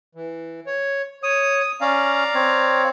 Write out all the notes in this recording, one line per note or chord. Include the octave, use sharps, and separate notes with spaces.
E3
C#5
C#5 D#6
C#4 D5 F5 A#5
C4 C#5